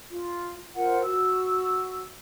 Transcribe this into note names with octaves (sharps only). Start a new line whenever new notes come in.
F4
F4 A#4 C5 F#5
F#4 E6